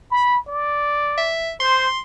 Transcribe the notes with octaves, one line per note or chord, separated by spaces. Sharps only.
B5
D5
E5
C5 C6